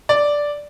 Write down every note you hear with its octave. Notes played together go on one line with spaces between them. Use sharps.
D5